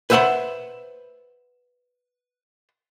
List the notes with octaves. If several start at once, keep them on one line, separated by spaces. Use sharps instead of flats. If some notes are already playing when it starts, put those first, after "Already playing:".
B4 C5 E5 F#5 B5 C6